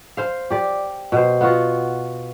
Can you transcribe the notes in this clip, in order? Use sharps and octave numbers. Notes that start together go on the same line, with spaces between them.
C5 F5
G4 D5
B2 C5
B3 F4 F#4